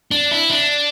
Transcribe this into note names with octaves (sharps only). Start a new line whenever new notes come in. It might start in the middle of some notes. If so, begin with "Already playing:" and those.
D4
E4
D4